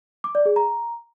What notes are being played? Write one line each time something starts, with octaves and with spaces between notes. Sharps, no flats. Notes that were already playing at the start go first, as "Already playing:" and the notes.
D6
D5
G#4
A#5